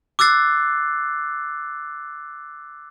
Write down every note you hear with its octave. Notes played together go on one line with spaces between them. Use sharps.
D6 E6 F#6 A6 C7